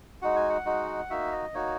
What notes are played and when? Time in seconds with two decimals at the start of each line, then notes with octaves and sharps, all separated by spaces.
0.22 G#3 D#4 F#4 F#5
0.36 G#5
0.50 F#5
0.66 G#3 D#4 F#4
1.10 A#3 D#4 F#4 E5
1.32 D#5
1.54 A#3 D#4 F#4 C#5